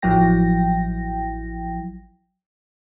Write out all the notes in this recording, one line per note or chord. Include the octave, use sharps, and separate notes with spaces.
A1 F3 F#3 E4 G5 A#6